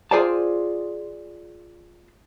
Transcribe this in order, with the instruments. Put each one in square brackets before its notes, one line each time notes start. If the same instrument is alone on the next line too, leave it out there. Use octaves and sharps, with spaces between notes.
[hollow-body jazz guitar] F4 G#4 C5 D5 G5 A5